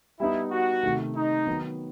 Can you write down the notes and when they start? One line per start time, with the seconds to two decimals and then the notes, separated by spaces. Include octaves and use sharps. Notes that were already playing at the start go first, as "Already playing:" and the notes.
0.20 G3 B3 D#4 E4
0.52 F#4
0.83 C3 D#3 A3
1.15 D#4
1.47 D#3 F#3 B3